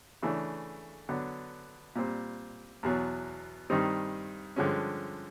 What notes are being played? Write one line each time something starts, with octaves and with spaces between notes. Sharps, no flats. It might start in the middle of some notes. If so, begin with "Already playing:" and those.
C#3 E3 A3 D4
D3 F#3 B3 D4
A#2 G3 C4
E2 B2 F#3
G2 D#3 G3 C4 D#4
G2 D3 F3 G#3 C#4